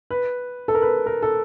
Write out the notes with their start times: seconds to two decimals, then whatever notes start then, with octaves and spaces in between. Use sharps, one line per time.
0.11 B4
0.68 A4
0.75 A#4
0.82 B4
1.06 A#4
1.22 A4